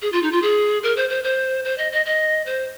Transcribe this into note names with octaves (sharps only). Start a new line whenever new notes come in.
G#4
F4
D#4
F4
G#4
A#4
C5
C5
C5
C5
D#5
D#5
D#5
C5